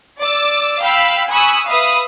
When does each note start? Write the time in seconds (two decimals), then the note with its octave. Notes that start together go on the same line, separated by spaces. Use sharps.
0.20 D5 D6 E6
0.81 F5 G5 B5 E6
1.31 G#5 B5 C#6 D#6 E6 F#6
1.69 B4 E5 F5 B5 D#6